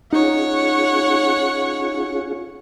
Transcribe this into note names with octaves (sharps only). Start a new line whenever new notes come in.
C#4 D#4 F4 G#4 C#5 F#5